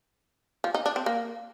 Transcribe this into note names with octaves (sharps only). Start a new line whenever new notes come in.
F3
D#4
D4
C4
A#3